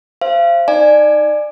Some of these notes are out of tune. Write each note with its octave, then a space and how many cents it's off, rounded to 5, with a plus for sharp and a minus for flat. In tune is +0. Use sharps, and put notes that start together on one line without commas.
C5 +15 F5 -35
D#4 +0 D5 +25 G#5 +0